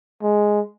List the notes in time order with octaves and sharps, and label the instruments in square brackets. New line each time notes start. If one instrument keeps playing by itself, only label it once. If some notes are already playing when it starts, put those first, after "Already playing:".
[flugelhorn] G#3